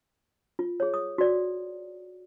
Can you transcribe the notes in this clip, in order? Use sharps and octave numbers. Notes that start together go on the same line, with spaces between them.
F4
G#4 C#5
D#6
F#4 D5